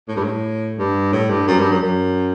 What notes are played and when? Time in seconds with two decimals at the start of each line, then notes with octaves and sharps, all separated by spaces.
0.08 A2
0.16 G2
0.24 A2
0.78 G2
1.13 A2
1.30 G2
1.47 F#2
1.59 G2
1.71 F#2
1.82 F#2